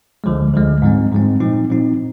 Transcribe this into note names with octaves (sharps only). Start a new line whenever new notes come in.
D2 D3 F3 G#3
D2 D3 F3 G#3
G#2 F3 G#3 C4
G#2 F3 G#3 C4
A#2 F3 C4 D#4
A#2 F3 C4 D#4